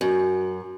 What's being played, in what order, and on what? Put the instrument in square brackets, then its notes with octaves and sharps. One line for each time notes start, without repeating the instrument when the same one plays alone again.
[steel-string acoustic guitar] F#2